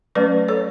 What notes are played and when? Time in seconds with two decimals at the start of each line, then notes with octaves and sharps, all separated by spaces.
0.15 F#3 A3 C#4 B4 D5
0.48 A4 C#5